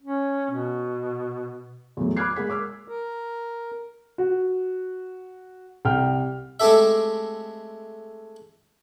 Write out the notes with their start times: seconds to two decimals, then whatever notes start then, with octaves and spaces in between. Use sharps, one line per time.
0.02 C#4
0.51 B2
1.97 E2 A2 F#3
2.17 B5 D6 F6 F#6 G#6 C7
2.36 G#3 A#3 G#4 B6
2.50 D6 E6 F6
2.88 A#4
4.18 F#4
5.85 C2 G5 F6
6.60 G#3 A3 C4 G4 A4 E5